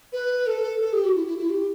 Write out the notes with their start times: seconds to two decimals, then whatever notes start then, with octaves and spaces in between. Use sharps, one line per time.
0.13 B4
0.47 A4
0.81 A4
0.93 G4
1.04 F#4
1.15 E4
1.26 E4
1.38 E4
1.50 G4